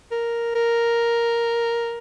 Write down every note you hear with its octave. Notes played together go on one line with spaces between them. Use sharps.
A#4
A#4